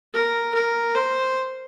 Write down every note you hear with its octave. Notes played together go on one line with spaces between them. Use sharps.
A#4
A#4
C5